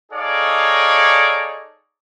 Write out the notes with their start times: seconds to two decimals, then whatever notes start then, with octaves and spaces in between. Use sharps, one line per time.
0.12 D#4 G#4 A4 C#5 D5 F5